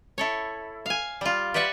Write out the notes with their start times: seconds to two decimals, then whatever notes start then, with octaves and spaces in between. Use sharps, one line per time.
0.18 E4 A4 C#5
0.86 F5 G#5
1.21 G3 F4
1.54 G4 B4 D5 E5 F#5